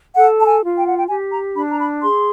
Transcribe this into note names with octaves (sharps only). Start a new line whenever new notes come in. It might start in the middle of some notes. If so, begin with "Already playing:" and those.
A4 F#5
A5
G#5
F4
G5
F#5
G5
G4 G#5
A#5
D4 B5
A#5
B5
G#4 C6